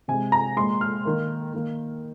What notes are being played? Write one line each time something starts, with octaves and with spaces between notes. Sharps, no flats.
C3 G#3 G#5
A#5
A#2 G#3 C6
F6
D#3 A#3
D#3 A#3